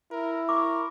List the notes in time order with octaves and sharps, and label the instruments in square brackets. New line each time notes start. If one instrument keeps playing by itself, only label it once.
[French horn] E4 [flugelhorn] A#4
[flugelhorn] A#4 [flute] C#6 [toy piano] D6